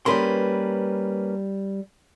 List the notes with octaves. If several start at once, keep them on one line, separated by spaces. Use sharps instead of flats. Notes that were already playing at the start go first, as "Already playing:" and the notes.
G3 A#3 C#4 G#4 B4 C6